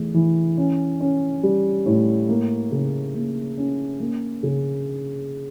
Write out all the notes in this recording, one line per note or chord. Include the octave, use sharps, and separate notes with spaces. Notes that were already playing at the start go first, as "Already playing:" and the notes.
Already playing: E2 A3
E3
C#4
C#4
G3
A2
A#3
C#3
A#3
C#4
A#3
C#3